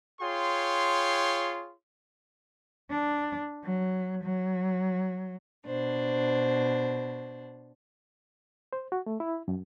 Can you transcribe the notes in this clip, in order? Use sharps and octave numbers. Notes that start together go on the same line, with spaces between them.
F4 G#4 C#5 G5 C6
D4
F#3
F#3
B2 D4 C5
C5
F#4
A3
E4
F#2